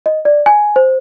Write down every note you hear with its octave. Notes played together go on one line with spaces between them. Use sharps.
D#5
D5
G#5
C5